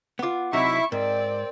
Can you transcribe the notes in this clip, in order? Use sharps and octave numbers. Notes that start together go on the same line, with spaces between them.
B3 F4 F#5 D6
C3 F#3 D#4 E4 E5 C#6
G#2 C4 A#4 D5